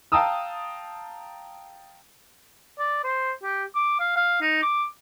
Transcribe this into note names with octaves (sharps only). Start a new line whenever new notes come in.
F5 G5 A5 A#5 D#6 E6
D5
C5
G4
D6
F5
F5
D#4
D6